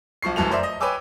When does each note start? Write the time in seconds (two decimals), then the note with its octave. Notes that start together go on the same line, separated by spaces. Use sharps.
0.22 B1 F3 C#6 C7
0.36 F1 F#2 E3 A3 A4 F7
0.51 A#4 C5 D5 E5
0.63 D#5
0.80 B4 C#5 G5 G#5 D6 E6